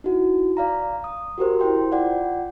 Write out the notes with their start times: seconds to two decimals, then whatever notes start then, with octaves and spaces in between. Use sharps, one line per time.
0.04 D#4 E4 F#4
0.57 D5 F5 A#5
1.04 D#6
1.38 F#4 G4 A#4 C5
1.59 E4 C5 G5 C6
1.92 F4 D5 F#5 G5